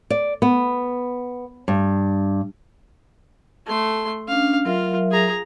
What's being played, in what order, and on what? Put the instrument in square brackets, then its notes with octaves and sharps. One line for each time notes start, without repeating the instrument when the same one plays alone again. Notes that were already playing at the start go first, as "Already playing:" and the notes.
[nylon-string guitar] D5
B3
G2
[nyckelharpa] A3 C6 [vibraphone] A4 A5
[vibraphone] C#4 D4 [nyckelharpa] F5
[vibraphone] F#3 A#4 E5 [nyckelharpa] F4
[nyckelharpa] G#4 A#5